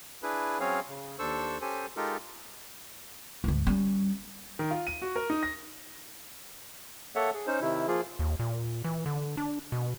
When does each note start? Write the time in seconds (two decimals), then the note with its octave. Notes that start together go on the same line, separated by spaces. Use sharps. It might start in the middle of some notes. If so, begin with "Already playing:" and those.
0.23 D4 E4 G#4 B4
0.60 F#3 C4 C#4 G#4 C#5 F5
0.88 C#3
1.19 D#2 D4 A4 C5 C#6 E6
1.61 C#4 G4 A4 C5 G#5
1.97 G#3 D#4 F4 G4 A4 A#4
3.44 D2 G#2
3.67 G3 C#4
4.59 D#3
4.71 F4
4.87 D#7
5.02 F#4
5.16 A#4
5.30 D#4
5.43 A#6
7.15 A#3 A4 C#5 E5 F#5
7.34 G#4
7.47 C#4 D#4 C5
7.61 C3 D#3 E4
7.88 F3 A#3 F4 G#4
8.19 D#2
8.39 A#2
8.84 E3
9.06 D3
9.37 D4
9.72 B2